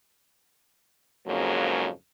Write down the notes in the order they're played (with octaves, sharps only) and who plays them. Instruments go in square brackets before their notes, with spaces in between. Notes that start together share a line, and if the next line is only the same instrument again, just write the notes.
[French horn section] F2 G#2 C#3 F#3 A#3